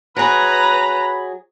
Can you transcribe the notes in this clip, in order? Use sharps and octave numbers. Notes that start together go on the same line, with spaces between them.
F#3 G#4 B4 A#5 B5